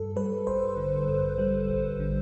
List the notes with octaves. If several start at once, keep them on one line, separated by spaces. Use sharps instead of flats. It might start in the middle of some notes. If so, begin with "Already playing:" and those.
Already playing: G2 A4
G3 B4
A1 C5
D3
G2
G3
A1
D3